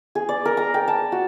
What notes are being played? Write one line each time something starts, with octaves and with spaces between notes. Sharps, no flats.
G#4
D5
A#4
A#5
G5
A5
F#4